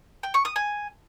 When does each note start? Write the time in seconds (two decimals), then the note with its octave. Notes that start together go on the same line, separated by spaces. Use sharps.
0.23 G5
0.34 C#6
0.45 D#6
0.56 G#5